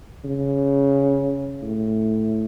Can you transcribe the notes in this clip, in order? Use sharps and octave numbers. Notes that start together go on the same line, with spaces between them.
C#3
A2